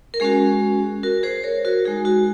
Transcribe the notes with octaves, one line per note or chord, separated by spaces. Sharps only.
A#4
G#3 C#4 F#4 G#4
F#4 A#4
G#4 C5
A#4 C#5
F#4 A#4
G#3 D#4 F#4 G#4
F#4